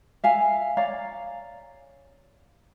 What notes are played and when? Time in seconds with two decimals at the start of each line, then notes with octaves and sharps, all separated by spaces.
0.24 E5 F5 G#5
0.77 C#5 D5 F5 A#5